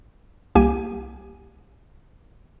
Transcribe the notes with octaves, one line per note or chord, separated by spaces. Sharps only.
C2 A#3 G4 G#5